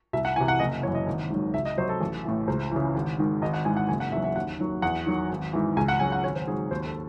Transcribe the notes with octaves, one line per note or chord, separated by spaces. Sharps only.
C2 E5
F#5
C3 E3 G#5
F#5
F#1 D#5
F#2 E3 C#5
D#5
G#1
G#2 D#3 F#3
C#2 E5
D#5
C3 F#3 C5
A4
A1
A2 E3
C#2 C5
C#3 E3
G#1
G#2 D#3
G#1 D#5
F#5
G#2 E3 G#5
F#5
F#1 G#5
F#5
E2 D#3 F#3 E5
E5
D#2 F#5
D#3 F#3
E2 F#5
D#3 F#3
G#1
G#2 E3
C#2 G#5
F#5
C#3 F#3 G#5
F#5
G#1 C#5
C5
G#2 F#3 G#4
D#2 C5
A4